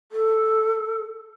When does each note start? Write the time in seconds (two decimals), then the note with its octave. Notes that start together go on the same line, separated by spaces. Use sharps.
0.12 A4